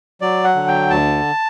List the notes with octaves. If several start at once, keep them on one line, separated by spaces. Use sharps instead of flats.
F#3 D5
F#5
D3
G5
D2 A5